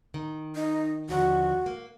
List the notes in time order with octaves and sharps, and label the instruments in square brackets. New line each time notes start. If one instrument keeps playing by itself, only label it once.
[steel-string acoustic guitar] D#3
[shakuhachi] D#4
[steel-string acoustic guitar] D#2 D3 F3 [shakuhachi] F#4
[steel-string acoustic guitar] A#3